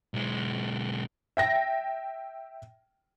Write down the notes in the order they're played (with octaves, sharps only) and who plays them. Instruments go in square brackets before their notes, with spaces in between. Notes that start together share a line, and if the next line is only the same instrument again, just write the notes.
[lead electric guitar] B1 G#3
[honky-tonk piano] E5 G5 A#6